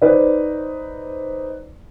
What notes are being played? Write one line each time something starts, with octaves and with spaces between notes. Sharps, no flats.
D#4 B4 C5 D5